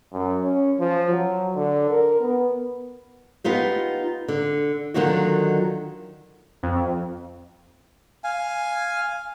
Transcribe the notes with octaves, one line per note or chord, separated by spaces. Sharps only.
F#2
C#4
F3
F#3
D3
A#4
B3
B3 D#4 F4 G4
D3
D3 D#3 F#3 B3 F4 F#4
F2
F5 G#5